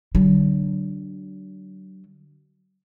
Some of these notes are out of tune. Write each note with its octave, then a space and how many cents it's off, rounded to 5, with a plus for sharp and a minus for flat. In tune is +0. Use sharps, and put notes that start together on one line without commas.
D3 +0 F#3 +35